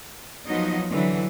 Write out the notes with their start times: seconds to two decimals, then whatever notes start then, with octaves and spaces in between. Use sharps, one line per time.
0.47 F3 F#3 B3 D#4 D#5
0.91 D3 E3 F#3